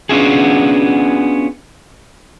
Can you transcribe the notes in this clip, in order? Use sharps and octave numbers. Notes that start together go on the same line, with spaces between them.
B3 C#4 D4 F4 F#4 G#4